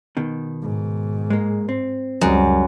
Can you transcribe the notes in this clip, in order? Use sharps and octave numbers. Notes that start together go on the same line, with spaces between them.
B2 D#3
G#2
G#3 A#3
C4
C#2 F#2 G3